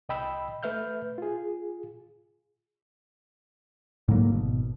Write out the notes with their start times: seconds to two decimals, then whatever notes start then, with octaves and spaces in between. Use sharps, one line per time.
0.09 C2 D#5 G5 B5 E6
0.63 A3 B4 E5 F6 G6
1.18 F4 G#4
4.08 G#2 D3 F#3 A#3
4.32 G#1 B2